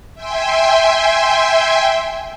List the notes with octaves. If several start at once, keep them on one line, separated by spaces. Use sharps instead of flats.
E5 G5 G#5 C6